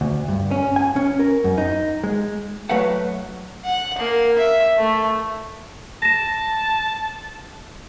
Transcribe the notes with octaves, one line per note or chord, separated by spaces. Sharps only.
D2
G2
C#4
G#5
C#4
A#4
F#2
D#4
G#3
F#3 A3 B4 F5 F#5
F#5
A#3
E5
A3
A5 A#6 E7